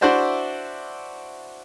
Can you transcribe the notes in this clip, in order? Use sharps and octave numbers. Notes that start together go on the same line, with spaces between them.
D4 E4 F#4 C5 D5 E5